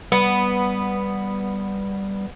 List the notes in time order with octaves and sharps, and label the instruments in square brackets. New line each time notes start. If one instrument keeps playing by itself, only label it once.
[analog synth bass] G3 [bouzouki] B3